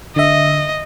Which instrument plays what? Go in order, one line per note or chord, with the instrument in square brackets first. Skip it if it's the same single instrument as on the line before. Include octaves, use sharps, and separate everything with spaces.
[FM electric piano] D3 E5 [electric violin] D#5